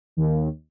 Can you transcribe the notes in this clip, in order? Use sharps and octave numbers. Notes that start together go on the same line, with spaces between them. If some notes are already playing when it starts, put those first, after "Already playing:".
D#2